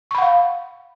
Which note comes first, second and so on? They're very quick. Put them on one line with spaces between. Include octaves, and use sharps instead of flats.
C#6 B5 F#5 F5